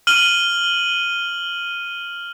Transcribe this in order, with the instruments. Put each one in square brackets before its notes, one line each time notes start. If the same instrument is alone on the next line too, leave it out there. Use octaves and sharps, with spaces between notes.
[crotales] F6 D#7 F#7 G7